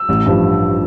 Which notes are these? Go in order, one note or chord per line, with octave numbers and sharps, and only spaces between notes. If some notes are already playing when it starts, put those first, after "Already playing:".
Already playing: E6
A1
G2 F3